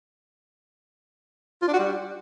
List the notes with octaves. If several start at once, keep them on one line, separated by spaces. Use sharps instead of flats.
F4
D4
F#4
G3